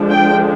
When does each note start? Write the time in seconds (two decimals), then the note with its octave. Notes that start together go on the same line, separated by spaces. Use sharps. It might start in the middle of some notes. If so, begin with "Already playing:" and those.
Already playing: D3 F3 G#3 D4
0.09 G5